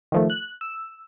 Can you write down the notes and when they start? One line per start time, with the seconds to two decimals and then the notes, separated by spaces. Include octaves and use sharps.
0.12 D#3 F3 A3
0.30 F#6
0.61 E6